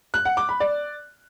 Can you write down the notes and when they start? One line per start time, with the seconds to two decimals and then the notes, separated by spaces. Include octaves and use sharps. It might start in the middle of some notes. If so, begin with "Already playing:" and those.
0.14 F#6
0.25 F#5
0.37 D6
0.49 B5
0.60 D5